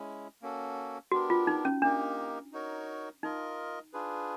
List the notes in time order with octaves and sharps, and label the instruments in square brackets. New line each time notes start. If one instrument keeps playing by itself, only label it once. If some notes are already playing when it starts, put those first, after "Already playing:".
Already playing: [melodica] G#3 C#4 E4
A#3 C#4 F#4 A4
[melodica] B3 D4 G4 A#4 [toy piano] F#4
[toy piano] F4
D#4
C#4
[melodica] A#3 D#4 G4 A#4 [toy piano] D4
[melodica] D#4 F#4 A#4 C#5
[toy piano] D#4 [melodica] F4 A#4 D#5
[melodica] D4 F4 G#4 B4